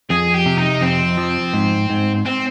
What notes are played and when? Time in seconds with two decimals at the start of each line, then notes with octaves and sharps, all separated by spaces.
0.10 F2 G#4
0.34 G4
0.46 C3
0.58 D#4
0.81 F2 C4
1.18 F3
1.53 G#2
1.90 G#2
2.25 C4